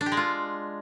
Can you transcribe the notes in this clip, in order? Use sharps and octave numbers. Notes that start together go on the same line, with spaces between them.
D4
G4
G#3
F4